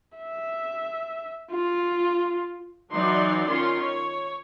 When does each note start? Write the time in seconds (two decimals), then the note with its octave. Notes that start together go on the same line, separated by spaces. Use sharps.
0.18 E5
1.51 F4
2.92 E3 F#3 D#4 D5 C6
3.49 D#3 C#4 F4 C6
3.80 C#5